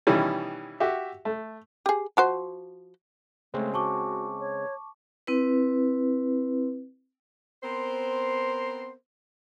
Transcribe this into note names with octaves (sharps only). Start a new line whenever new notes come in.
B2 D#3 E3 G3 C#4
F#4 G4 E5
A3
G4 G#4
F3 F#4 C5
C#3 G#3 A3 C4
F#4 A5 C#6 D6
C#5
C4 E4 B4
B3 C4 A#4 C5